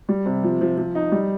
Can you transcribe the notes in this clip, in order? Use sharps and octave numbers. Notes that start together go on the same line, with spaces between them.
G3
C3
F3
F3
F3
D#4
G3